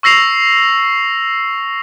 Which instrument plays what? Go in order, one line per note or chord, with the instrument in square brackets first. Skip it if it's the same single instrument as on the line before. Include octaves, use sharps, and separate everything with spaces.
[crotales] C#6 E6 A#6 C7 F7